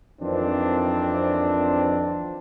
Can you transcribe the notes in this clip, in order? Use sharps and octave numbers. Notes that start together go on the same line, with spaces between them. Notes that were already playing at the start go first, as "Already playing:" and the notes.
F2 D#3 E3 A#3 C4 D4